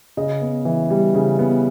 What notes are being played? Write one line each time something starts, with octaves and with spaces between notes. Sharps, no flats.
C#3 D#5
B3
E3
G3
C#3
B3